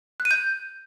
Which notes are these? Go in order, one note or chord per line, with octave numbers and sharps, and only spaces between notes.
F#6
D#7
G6